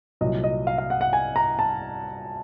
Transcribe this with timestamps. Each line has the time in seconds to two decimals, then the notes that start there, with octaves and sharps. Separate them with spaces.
0.21 C2 A#2 F#3 D#5
0.44 D#5
0.67 F5
0.78 F5
0.90 F#5
1.01 F#5
1.13 G#5
1.36 A#5
1.59 A5